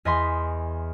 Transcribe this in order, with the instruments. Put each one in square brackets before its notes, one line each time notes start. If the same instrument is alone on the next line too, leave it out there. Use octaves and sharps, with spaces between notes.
[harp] E2 D#5 G#5 C6 B6